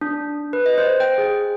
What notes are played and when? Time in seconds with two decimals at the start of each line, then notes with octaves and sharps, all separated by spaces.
0.01 D4
0.53 B4
0.66 D#5
0.78 C5
1.00 G5
1.18 G#4